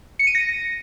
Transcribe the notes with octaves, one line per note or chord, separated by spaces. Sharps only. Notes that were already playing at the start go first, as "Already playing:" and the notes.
C#7
D#7
A#6